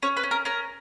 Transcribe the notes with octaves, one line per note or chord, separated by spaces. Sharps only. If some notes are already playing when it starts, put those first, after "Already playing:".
C#4 C#5
B4
C#4
A#4
C#4 A#4